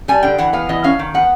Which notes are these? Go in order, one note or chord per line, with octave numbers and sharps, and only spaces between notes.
G3 G#5
D3 G5
E3 F#5
B3 F5
E3 D#5
C#4 F5
D#3
B3 F#5